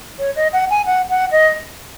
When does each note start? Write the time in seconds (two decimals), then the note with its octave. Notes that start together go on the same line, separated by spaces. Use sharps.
0.19 C#5
0.36 D#5
0.53 F#5
0.70 G#5
0.86 F#5
1.10 F#5
1.31 D#5